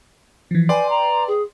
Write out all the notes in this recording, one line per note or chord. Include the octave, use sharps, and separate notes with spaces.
E3 F3
B4 D5 G5 G#5 C6
A#5
G#4